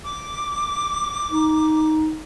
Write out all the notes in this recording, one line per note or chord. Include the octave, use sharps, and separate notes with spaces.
D6
D#4